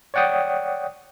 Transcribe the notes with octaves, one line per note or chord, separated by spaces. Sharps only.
C#5 D5 F#5 G5 D#6